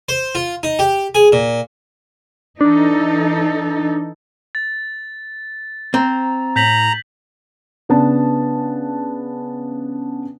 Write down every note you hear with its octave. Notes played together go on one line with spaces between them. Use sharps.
C5
F4
D#4
G4
G#4
A#2
E3 D4 D#4 A4
A6
C4 A#5
A2 A#5 G6 B6 F#7
C#3 B3 D4 A5